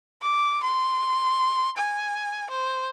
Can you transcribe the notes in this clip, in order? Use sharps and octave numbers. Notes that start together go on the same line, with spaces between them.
D6
C6
G#5
C5